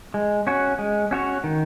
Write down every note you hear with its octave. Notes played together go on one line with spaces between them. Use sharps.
G#3
C#4 F#4 C#5
G#3
C#4 F#4 C#5
D#3